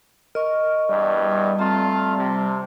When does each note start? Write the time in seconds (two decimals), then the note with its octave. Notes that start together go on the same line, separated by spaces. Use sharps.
0.35 A#4 D#5 C#6
0.89 E2 G2 G3
1.59 A3 C4 F4 A5 A#5
2.17 C3